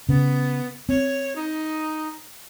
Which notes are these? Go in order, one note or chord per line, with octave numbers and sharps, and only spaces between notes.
C#3 B3
C4 C#5
D#4